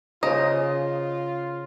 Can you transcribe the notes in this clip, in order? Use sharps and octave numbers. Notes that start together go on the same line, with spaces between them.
C#3 F4 G#4 C5 D#5 A#5